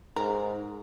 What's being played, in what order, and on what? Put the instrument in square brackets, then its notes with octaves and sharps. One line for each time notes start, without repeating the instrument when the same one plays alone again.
[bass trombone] G#2 [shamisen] A#4